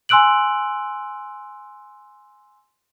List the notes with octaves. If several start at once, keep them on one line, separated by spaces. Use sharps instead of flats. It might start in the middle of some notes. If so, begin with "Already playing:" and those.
G#5 C6 E6 F#6 D7 F#7